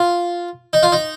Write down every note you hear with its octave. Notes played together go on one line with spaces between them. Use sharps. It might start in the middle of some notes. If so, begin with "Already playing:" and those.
Already playing: F4
D#4
F4
D#4